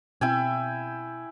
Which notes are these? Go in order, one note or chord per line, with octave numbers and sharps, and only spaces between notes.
B2 C4 E4 G5 G#5